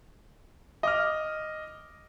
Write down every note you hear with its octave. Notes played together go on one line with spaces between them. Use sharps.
D#5 D6 F6